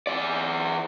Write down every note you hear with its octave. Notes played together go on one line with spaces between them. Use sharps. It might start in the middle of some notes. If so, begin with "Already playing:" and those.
E3 D5